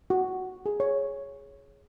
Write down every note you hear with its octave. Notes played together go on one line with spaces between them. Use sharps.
F#4
G#4
C#5